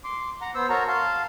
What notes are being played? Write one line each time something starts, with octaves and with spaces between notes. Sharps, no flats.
C6 D6
F#5 A#5
B3 C5 E6
F#4 A#4 C#5 A5 A#5
F5 A5 C6